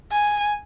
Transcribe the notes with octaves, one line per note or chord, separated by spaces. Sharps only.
G#5